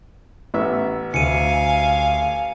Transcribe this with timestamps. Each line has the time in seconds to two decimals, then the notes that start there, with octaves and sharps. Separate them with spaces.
0.54 A1 B3 E5
1.14 D2 F5 G#5 C#7 D#7